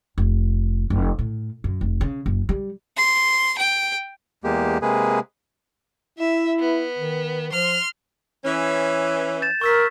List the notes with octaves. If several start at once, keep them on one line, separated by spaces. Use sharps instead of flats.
F1
F1
A2
F#2
F1
C#3
F#1
G3
C6
G5
E2 G#3 A#3 G4
C3 G#3 A#3 G#4 B4
E4 E5
B3
D#3
F3 C6 F6
E3 C#4
G6 A6 E7
A#4 C#6 E6 B6